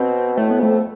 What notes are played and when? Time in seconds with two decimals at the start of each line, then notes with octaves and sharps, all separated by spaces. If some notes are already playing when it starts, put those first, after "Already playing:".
Already playing: B2 C4
0.37 A2 A3
0.51 B3
0.60 F2 A3